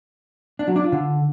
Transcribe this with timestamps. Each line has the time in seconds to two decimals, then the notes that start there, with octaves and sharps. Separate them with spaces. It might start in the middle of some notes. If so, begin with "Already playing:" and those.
0.59 D4
0.68 F#3
0.76 D4
0.84 F4
0.92 D3